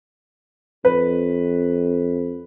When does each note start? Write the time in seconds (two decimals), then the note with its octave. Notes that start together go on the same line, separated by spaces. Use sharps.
0.85 F2 B4